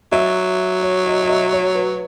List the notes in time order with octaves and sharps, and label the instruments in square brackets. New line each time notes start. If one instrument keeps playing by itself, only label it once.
[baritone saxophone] F#3 [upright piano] E5
[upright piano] C#5
D#5
D#5
E5
C#5
B4